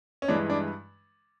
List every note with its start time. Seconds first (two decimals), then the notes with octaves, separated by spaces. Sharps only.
0.22 C#4
0.28 G2 E3 G#3 D4
0.50 D4